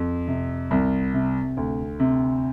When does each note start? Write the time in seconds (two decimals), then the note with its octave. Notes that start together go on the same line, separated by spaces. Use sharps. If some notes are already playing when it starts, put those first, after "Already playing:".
Already playing: F2
0.28 C3
0.71 C2
1.14 C3
1.57 D2
2.00 C3